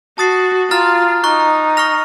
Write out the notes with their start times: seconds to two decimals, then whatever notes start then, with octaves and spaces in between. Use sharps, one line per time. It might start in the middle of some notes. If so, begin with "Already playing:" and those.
0.18 F#4 A5 D#6 A6 C7
0.71 F4 A#5 F6 A6
1.24 D#4 A#5 C#6 F#6
1.77 C#6 F6 A#6 F7